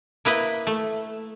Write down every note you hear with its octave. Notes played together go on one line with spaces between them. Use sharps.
A#3 E4 B4 D#5
A3